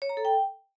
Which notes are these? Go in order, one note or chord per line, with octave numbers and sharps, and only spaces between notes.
C#5
A#5
A4
G5